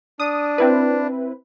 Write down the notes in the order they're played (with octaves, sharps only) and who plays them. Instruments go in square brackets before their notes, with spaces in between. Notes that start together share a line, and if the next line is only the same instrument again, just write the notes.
[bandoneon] D4 [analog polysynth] D#6
[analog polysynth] C4 E4 B4